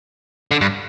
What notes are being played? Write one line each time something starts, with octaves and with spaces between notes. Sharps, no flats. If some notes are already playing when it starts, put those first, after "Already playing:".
D3
G2